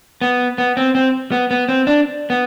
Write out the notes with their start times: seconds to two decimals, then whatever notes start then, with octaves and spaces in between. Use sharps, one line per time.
0.21 B3
0.58 B3
0.77 C4
0.95 C4
1.32 B3
1.51 B3
1.69 C4
1.87 D4
2.30 B3